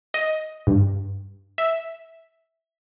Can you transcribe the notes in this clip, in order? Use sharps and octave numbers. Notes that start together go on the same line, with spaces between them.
D#5
G2
E5